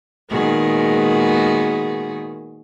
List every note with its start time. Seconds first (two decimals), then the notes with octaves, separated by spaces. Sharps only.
0.29 A#2 D#3 G#3 B3 F#4 G#4